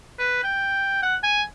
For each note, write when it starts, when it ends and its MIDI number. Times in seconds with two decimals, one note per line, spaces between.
0.19 0.42 71
0.44 1.01 79
1.03 1.16 78
1.23 1.43 80